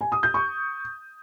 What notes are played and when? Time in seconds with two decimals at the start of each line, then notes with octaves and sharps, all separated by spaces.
0.01 G#5
0.12 D#6
0.23 G6
0.34 C#6